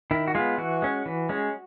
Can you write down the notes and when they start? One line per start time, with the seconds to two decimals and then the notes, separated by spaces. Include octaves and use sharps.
0.11 D#3 E4
0.28 F#4
0.35 G#3 B3 F4
0.58 E3 F#4
0.82 G#3 C#4
1.06 E3
1.29 G#3 C#4